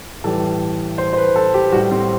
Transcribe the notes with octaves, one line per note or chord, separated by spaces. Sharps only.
A2 E3 G3 A4
C5
C5
B4
A4
G4
A2 G3 F#4
C4